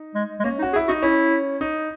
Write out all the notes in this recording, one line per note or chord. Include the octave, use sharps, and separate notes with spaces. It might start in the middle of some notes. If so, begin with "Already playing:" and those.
Already playing: D#4
G#3
G#3
A#3 C#4
D#4
F#4
G#4
E4
D#4 F#4
C#4 E4
D#4